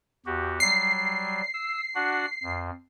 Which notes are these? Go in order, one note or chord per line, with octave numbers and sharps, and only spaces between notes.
E2 F#4 G4
F#3 G3 C7
E6
D4 F#4 F#5
F2